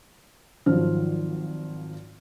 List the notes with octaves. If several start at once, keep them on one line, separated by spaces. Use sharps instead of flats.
G#1 D#3 F3 F#3 C5 F6